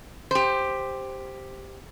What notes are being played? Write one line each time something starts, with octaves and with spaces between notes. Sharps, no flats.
G4 C5